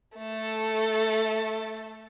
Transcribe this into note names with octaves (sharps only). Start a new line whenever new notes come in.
A3 A4